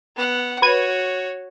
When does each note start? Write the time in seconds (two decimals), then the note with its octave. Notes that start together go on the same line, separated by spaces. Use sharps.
0.16 B3 F#5
0.62 F#4 B4 C#5 G#6 D#7